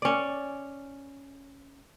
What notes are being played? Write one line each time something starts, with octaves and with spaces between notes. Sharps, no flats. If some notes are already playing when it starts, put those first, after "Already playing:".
C#4 D5